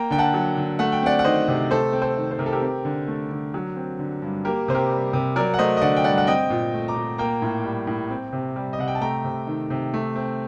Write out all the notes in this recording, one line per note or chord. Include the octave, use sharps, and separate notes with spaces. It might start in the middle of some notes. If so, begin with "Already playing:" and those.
Already playing: A#3 G5 A#5
D3 G5
F#5 A5
F#3
D3
A3 F#5
G5
C4 D5 F#5
F#5
D#3 C5 D#5
C3
A3 A4 C5
C4
A4 C5
D#3
C5
C3 A#4
A4
G4 A#4
C4
D3
A3
D3
F#3
C4
D3
G2
A#3 G4 A#4
C3 C5
G4 A#4
G3
C3
F#3 A#4 D5
F#5
A3 C5 D#5
D#5
D3 D5 F#5
G5
G2 D5 F#5
F#5
C4 D#5 G5
A#2
A3
A#5 D6
A#2
A#3 G5 A#5
A2
G3
A2
C4
C3
G3
D#5
C3 F#5
G5
A5
A3 G5 A#5
C3
D#3
C3
A3
C4